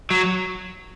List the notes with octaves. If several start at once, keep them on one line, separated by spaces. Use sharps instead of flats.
F#3